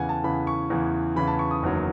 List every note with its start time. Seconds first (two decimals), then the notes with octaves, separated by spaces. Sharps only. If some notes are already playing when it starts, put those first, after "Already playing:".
Already playing: E2 C#3 E3 F#5 G#5
0.09 A5
0.24 E2 C#3 E3 B5
0.47 C#6
0.70 E2 C#3 E3
1.16 E2 C#3 E3 B5
1.27 A5
1.39 C#6
1.51 D#6
1.62 F#1 E2 D#3 F#3